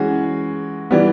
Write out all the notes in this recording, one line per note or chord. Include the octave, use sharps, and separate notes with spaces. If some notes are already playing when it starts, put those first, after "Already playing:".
Already playing: E3 G#3 C#4 F#4
E3 G3 B3